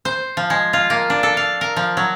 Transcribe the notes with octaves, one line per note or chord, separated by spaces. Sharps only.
C5
F3
G#3
F4
A#3
D4
A4
F5
A#4
F3
F#3